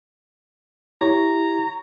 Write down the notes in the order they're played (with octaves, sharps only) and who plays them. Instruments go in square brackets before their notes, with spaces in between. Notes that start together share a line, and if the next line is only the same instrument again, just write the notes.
[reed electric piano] E4 G4 [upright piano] C#5 [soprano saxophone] A#5